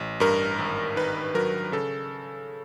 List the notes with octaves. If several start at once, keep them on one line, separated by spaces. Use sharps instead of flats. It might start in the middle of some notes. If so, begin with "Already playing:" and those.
Already playing: A1
G2 A#4
G#1
D#3 B4
F#3 A#4
C#3 A4